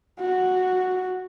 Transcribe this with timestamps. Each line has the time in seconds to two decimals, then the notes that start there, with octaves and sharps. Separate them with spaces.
0.20 F#4